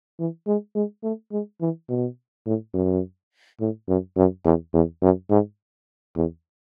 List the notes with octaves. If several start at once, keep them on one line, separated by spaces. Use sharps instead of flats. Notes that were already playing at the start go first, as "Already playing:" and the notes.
E3
G#3
G#3
A3
G#3
E3
B2
A2
F#2
A2
F#2
F#2
E2
E2
F#2
G#2
E2